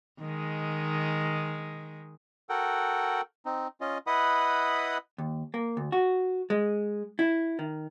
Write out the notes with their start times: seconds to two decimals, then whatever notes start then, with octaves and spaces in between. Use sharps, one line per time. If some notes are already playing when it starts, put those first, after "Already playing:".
0.20 D#3 G#3
2.49 F#4 A4 A#4 F#5 G5
3.46 C4 D#4
3.81 C#4 F4 D#5
4.07 E4 B4 D#5 F#5 B5 D#6
5.18 D#2
5.54 A#3
5.77 D2
5.92 F#4
6.50 G#3
7.19 E4
7.59 D#3